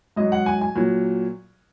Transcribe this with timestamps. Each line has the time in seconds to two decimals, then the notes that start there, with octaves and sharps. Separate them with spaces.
0.16 G#2 F#3 D#5
0.32 F#5
0.46 G#5
0.61 G#5
0.75 A#2 F#3